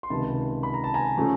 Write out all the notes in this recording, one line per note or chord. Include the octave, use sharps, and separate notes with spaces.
C6
C#2 C3 D#3 A5 B5
B5
A#5
A5
G#5 A#5
C#3 F3 A3